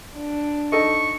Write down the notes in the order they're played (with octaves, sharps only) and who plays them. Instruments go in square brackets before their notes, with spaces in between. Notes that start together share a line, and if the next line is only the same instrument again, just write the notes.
[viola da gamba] D4
[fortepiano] D#4 A4 D#5 [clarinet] C#6